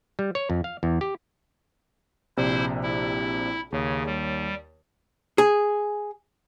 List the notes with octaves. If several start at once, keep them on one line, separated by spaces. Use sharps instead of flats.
G3
C#5
F2
F5
E2
G4
A#1 C3 E4 C5 D5
E4
D#2 C#3 C#5
G3
G#4